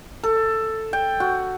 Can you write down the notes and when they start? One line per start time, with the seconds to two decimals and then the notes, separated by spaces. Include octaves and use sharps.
0.23 A4
0.93 G5
1.20 F#4